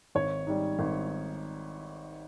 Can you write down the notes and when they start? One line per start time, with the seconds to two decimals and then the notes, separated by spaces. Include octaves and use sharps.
0.15 G#1 C#5
0.47 G#2 G3
0.79 G#1